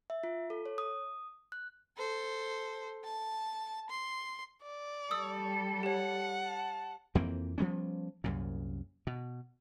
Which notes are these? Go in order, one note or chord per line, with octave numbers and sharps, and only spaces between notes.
E5
F4
A4
C#5
D#6
F#6
A4 C5
A5
C6
D5
G3 A4 D#6 E6
G4 C#5 F#5
A5
F2 E3 A#3 C4
F3 G3 B3 C#4
C2 F#2 A#2
B2